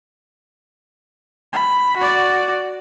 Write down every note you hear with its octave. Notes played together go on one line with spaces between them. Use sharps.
B5
F#4 D5